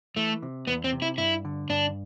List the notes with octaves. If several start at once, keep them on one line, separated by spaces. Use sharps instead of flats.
E3 A3
C3
E2 B3
C4
C3
E4
G2 E4
D3
G2 D4